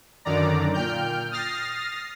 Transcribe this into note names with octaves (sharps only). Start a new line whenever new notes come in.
F#2 D3 D#3 D5 A#5
A#2 G5 F6 G6
D#6 F6 A6 A#6 C7